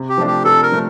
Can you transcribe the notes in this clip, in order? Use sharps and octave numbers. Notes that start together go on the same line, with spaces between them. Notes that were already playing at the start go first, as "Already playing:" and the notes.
Already playing: C3
G4
F3 A3 D4
G4
C3 A4
A#4
F3 A3